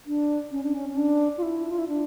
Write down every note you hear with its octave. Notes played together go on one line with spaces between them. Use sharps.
D4
C#4
D4
C#4
C#4
D4
F4
E4
F4
E4
D4